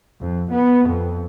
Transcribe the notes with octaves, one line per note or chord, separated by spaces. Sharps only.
F2
B3
F2